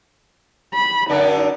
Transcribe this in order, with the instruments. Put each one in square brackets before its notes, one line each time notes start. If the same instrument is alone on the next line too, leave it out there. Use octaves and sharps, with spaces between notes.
[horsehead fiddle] B5
[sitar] F#2 D3 D4 [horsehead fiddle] D#4